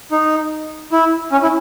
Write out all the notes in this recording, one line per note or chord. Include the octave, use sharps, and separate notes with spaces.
D#4
E4
C#4
E4